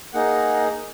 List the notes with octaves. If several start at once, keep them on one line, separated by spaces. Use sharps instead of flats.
A#3 D#4 G#4 F#5